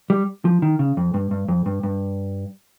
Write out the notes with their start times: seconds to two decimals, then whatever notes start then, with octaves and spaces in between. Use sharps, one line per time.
0.10 G3
0.45 F3
0.62 D#3
0.79 C#3
0.97 F2
1.14 G2
1.31 G2
1.48 F2
1.66 G2
1.83 G2